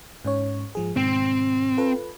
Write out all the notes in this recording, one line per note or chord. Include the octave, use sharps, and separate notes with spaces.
G#2 C#4 C#5
G#2 F3 G#4
G#2 B2 D#3 C4
F4 A4 B4